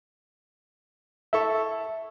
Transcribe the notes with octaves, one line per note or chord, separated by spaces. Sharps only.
E4 A4 E5 C#6